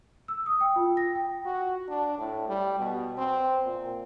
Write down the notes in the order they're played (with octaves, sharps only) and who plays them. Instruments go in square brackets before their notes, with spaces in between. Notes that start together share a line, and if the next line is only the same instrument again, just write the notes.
[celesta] E6
D#6
G5
F4
A#6
G5
[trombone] F#4
D4
A2
G3
B2
C4
A#2